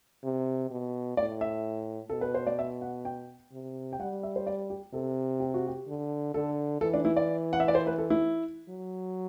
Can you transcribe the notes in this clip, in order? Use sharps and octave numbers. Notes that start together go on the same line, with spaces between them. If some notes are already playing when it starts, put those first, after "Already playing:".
C3
B2
A2 D5
E5
B2 A4
B4
C5
D5
E5
F#5
G5
C3
G5
G3 F#5
E5
C5
D5
G4
C3 A4
G4
F#4
G4
D3
D3 A4
E3 A4
D4
E4
D5
F#5
E5
D5
C5
B4
A4
E4
F#3